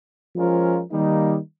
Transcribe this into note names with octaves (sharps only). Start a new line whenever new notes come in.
F3 G#3 C#4 F4 A#4
D#3 G3 A#3 D#4